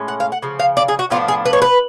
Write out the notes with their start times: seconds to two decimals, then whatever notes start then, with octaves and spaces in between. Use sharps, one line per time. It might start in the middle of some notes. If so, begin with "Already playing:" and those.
Already playing: A2 G#3 C#4
0.08 F#5
0.20 F5
0.32 F#5
0.42 C#3 F3
0.60 F5
0.77 D5
0.88 G#4
0.99 F#4
1.10 A2 F3 B3 D4 F4
1.28 G#4
1.45 B4
1.53 C#5
1.62 B4